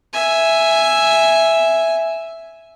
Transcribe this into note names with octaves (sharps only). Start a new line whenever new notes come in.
E5 G#5